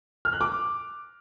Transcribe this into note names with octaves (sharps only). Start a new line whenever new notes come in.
F6
F#6
D6